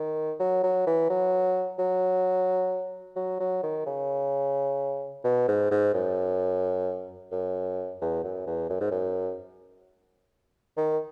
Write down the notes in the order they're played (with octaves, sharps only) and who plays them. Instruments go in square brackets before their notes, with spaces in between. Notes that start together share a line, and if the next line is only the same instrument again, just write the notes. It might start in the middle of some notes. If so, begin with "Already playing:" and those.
Already playing: [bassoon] D#3
F#3
F#3
E3
F#3
F#3
F#3
F#3
D#3
C#3
B2
G#2
G#2
F#2
F#2
E2
F#2
E2
F#2
G#2
F#2
D#3